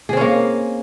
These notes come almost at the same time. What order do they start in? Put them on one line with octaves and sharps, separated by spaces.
G#4 C4 C#4 A#3